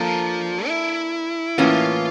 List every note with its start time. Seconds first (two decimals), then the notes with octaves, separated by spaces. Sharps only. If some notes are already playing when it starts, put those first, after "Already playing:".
Already playing: F3 A#3 D4 A4
0.67 E4
1.58 A2 E3 A#3 C#4 F4